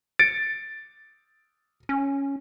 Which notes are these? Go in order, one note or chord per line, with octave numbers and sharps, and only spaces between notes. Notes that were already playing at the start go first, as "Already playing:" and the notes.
A6 C#7 D7
C#4